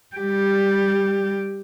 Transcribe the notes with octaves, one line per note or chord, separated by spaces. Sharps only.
G3 G4